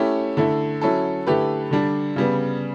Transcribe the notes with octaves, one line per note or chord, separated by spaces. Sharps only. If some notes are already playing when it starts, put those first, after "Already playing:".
Already playing: A3 C#4 E4 G4
D3 A3 E4
F#3 C#4 E4 A4
D3 A3 E4 G4 B4
D3 G3 D4
C#3 G3 B3